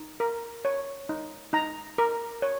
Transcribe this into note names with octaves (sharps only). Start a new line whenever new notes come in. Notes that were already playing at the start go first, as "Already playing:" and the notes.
Already playing: D#4
A#4
C#5
D#4
D#4 A#5
A#4
C#5